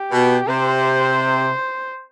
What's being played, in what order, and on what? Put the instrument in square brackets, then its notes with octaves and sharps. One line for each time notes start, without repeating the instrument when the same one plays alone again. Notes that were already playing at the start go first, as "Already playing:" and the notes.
Already playing: [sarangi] G4
[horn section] B2
[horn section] C3 [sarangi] C5